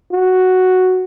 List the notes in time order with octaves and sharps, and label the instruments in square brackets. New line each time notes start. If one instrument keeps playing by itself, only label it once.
[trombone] F#4